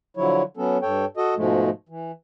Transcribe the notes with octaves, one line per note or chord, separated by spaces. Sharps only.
D3 F3 F#3 E4 C#5
F#3 B3 C#4 A4
G2 A4 C#5 G5
F#4 A4 D#5
G#2 B2 F3 G#3 A3
E3